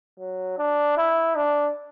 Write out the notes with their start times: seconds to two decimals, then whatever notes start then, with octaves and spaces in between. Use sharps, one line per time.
0.20 F#3
0.58 D4
0.97 E4
1.36 D4